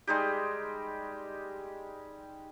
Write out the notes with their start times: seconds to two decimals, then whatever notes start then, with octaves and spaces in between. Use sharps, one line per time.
0.07 G3 G#3 D#4 G4